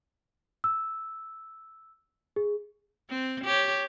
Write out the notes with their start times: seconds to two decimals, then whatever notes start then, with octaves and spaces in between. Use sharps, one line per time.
0.64 E6
2.36 G#4
3.10 C4
3.45 G4 C#5